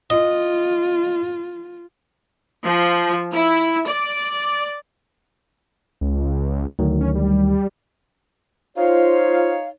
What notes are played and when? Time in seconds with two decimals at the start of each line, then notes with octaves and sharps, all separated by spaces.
0.10 F4 D#5
2.64 F3
3.33 E4
3.87 D5
6.01 C#2
6.79 D2 D#3 F#3
7.01 C#4
7.15 G3
8.77 D#4 F4 C5 C#5 F5